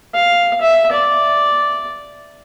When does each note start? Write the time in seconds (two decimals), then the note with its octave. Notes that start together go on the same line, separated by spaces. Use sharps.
0.15 F5
0.61 E5
0.92 D5